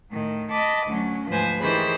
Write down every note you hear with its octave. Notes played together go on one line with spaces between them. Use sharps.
A2 D#3
D#5 A5 B5 D6
D2 F#3 C#4
D2 G#2 F3 B4 C5 G#5
D#3 E3 G4 G#4 C5 B5